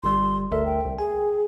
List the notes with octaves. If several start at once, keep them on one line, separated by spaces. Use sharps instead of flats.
G1 G3 C6
D2 A4 A#4 E5
G5
C2
G#4 G#5